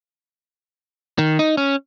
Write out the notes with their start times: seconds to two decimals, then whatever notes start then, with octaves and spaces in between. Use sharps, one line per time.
1.18 D#3
1.39 D#4
1.57 C#4